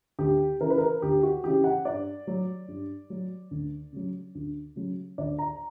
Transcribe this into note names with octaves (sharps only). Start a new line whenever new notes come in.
D2 G4
C#3 E3 A#4
B4
A#4
D2 G4
F#4
C#3 E3 G4
F#5
G2 D5
F#3
G2
F#3
D2
C#3 F#3
D2
C#3 F#3
D2 D5
A#5